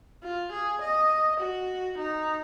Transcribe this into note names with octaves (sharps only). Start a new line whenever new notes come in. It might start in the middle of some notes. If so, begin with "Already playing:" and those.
F4
G#4
D#5
F#4
D#4